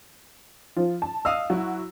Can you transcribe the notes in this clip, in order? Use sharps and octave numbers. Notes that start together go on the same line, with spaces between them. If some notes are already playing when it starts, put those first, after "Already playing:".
F3 F4
A5
D#5 F5 D#6 E6
F#3 E4 F#4